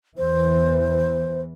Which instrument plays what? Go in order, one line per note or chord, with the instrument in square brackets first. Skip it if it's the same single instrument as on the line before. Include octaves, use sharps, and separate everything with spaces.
[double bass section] E2 E3 [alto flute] C5